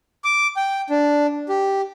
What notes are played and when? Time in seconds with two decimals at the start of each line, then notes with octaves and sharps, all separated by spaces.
0.24 D6
0.57 G5
0.90 D4
1.49 G4